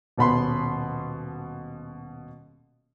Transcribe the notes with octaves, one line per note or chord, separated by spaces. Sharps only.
D#1 B2 B5 C6